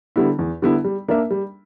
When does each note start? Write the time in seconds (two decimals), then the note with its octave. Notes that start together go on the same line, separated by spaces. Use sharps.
0.16 D3 G3 B3 E4
0.39 E2
0.62 D3 G3 B3 E4
0.84 G3
1.08 A#3 D4 A#4 E5
1.30 G3